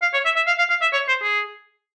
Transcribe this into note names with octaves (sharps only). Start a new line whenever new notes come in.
F5
C#5
E5
E5
F5
F5
F5
E5
C#5
C5
G#4